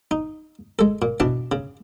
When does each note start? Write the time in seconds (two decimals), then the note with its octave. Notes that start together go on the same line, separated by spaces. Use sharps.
0.11 D#4
0.79 G#3 A4
1.02 A#2
1.20 B2 E3 D4 A5
1.52 C#3